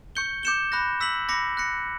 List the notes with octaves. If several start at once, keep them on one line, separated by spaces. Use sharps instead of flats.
C#6 G6 C#7 G7
D6 G6 C#7 E7 G7
B5 F#6 A#6
E6 B6 F#7
B5 D6 A#6 C#7
F#6 A#6 C#7